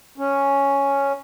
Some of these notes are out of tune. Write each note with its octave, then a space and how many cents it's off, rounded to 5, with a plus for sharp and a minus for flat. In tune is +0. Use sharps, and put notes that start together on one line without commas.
C#4 +0